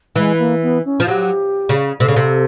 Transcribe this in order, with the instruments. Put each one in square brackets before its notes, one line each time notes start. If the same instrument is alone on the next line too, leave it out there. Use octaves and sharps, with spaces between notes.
[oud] E3 [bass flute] G#3
[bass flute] A#3
B3
C#4
[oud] F3
[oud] F#3 [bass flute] G4
[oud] C#3
[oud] C3 [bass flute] A4
[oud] C#3
C3